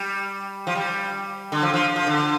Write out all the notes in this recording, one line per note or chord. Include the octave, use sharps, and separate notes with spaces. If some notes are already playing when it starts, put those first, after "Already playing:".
Already playing: G3
F3
G3
D3
F3
F3
F3
D3